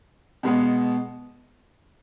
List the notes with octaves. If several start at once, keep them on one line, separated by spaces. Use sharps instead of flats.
B2 G#3 B3